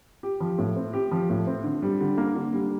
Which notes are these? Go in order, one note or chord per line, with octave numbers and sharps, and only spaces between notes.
G4
F3
A2
C4
G4
F3
A2
C4
D3
G3
D3
A#3
D3
G3